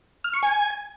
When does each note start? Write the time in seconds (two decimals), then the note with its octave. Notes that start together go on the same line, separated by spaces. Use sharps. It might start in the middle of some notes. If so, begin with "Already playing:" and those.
0.24 F6
0.34 C#6
0.43 G#5